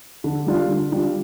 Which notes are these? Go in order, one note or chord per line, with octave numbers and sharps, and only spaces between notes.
D3
G3 D4 F4
D3
G3 D4 F4